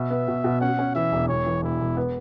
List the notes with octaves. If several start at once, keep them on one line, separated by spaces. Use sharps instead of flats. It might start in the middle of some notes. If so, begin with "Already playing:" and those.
Already playing: B2 E5
B3
B2
B2
C#4 F#5
C#4
E3 E5
E1
E1 C#5
E3
E1 E4
E1
B3